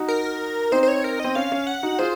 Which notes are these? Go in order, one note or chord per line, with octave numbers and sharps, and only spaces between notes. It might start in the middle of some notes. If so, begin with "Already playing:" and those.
Already playing: D#4 F#4
A#4
C4 D#4 C5
C5
C#5
A#4
C4 D#5
C#4 F5
C#4
F#5
D#4 F#4
F4 G#4 C5